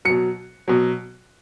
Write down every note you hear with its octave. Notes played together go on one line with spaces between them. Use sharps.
B2 F#3 C#7
B2 F#3